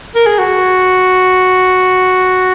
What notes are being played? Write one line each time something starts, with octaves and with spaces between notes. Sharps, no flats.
A#4
G#4
F#4